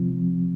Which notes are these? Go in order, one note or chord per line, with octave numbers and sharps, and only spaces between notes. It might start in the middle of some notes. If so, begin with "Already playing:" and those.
Already playing: C3 F3 C4